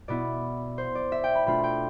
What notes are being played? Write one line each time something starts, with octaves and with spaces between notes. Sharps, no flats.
B2 B3 E4 D5
C5
D5
E5
G5
B5
B2 A3 D4 F4 B5
G5